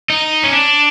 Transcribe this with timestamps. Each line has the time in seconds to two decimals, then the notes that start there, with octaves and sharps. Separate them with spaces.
0.10 D#4
0.43 C#4
0.52 D4